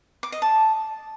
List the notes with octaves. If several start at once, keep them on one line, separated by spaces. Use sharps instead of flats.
D6
D#5
A5